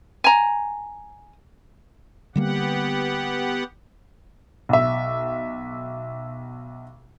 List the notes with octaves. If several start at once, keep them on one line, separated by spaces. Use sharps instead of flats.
G#5 A#5
D3 G3 A#3 B3 G4 F#5
B1 E5